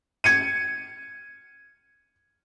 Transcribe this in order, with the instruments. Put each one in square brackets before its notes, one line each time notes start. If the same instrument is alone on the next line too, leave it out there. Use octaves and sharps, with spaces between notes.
[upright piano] G#6 C#7 D#7